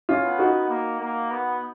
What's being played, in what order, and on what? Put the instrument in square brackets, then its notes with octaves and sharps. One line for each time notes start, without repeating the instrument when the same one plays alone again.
[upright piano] C#4 F4
[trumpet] B3
[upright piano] D#4 F#4
[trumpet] A#3
A#3
B3